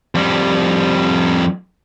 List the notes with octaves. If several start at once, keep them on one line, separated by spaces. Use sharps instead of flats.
F2 G3